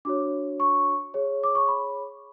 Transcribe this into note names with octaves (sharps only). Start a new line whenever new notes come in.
D4 F#4 C#5 D6
C#6
G#4 C#5
D6
C#6
B5